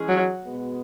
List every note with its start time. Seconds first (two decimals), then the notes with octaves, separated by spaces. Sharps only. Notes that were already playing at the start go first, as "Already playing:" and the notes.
Already playing: E3 G#3 C#4 G#4
0.08 F#3
0.43 B2 G#3 B3